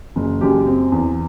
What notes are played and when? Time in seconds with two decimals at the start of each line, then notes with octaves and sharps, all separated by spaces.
0.16 F#1
0.41 F#2 G4
0.66 C4
0.92 E2